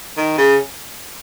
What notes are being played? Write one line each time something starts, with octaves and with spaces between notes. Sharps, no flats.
D#3
C#3